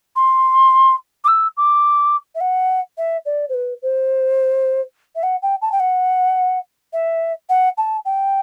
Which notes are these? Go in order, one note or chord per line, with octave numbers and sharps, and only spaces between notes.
C6
D6
E6
D6
E5
F#5
E5
D5
C5
B4
C5
E5
F#5
G5
A5
G5
F#5
E5
F#5
A5
G5